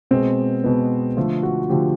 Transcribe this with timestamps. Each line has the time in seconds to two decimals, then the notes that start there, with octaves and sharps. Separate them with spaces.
0.11 B2 G#3 B3 C4
0.64 B2 G#3 B3
1.17 D3 F3 A3 F4
1.43 F#4
1.70 D3 F3 A3 G4